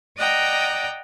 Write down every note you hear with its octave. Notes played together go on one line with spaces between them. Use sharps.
D5 D#5 F#5 G5 A#5